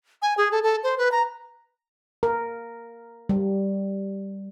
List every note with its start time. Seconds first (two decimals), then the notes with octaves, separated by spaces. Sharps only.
0.22 G#5
0.37 G#4
0.52 A4
0.63 A4
0.83 C5
0.98 B4
1.12 A#5
2.23 A#4
3.29 G3